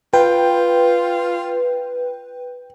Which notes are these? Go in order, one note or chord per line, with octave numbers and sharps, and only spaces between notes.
F4 B4 G5